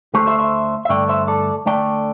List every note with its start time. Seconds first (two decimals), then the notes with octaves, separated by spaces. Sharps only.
0.14 D2 D3 A3 G4 C5
0.27 C5 E5
0.39 C5 E5
0.85 E5
0.89 G2 D3 A3 D5 G5
1.09 C5 E5
1.28 A4 D5
1.66 D2 D3 A3 D5 G5